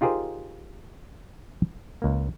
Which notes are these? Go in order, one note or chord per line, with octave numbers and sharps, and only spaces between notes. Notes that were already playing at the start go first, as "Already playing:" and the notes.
D#4 F4 G4 G#4 A#4 C5
C#2 A#3